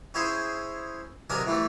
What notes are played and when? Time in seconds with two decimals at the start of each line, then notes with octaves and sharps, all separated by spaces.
0.14 C#4 E4 G#4 C5
1.30 B1 C3 D4 A#4 G#5 D#6
1.46 A2 E3 G3 A3